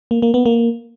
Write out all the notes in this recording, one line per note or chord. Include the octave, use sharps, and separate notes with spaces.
A#3
A#3
B3
A#3